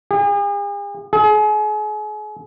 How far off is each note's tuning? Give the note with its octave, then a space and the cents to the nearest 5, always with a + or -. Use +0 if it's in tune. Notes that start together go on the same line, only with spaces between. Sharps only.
G#4 -45
G#4 +35